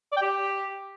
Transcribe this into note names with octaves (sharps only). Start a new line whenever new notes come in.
D5
G5
G4